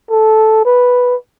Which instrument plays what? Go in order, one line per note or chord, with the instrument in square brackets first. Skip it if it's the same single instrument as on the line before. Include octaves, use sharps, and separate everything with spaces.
[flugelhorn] A4
B4